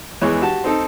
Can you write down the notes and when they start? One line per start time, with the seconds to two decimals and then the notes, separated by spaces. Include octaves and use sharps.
0.22 E2 E3 G#3 C#5
0.42 F#4 G4 A5
0.64 C4 D#4 A4